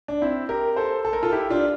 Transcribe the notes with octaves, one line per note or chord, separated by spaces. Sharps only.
D4
C4 E4
G4 A#4
A4 C5
A4
A#4
F4 A4
E4 G4
D4 F4